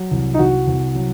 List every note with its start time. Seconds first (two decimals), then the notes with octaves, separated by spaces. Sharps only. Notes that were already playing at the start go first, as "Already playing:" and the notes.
Already playing: F#3
0.11 C2
0.34 D#4
0.39 C2 F#4
0.67 C2
0.95 F#3